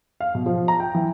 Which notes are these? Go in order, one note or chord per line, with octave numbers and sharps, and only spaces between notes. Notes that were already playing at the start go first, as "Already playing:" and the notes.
F5
B2
F3
A#5
G5
E3